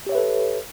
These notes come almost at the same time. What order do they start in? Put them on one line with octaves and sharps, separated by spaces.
G4 C#5 E5 B4 A4